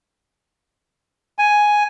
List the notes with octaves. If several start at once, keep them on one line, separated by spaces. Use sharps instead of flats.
G#5